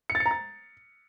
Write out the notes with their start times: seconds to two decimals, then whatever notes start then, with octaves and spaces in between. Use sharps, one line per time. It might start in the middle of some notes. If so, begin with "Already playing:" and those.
0.10 C#7
0.15 A6
0.20 C#7
0.26 A#5
0.31 A6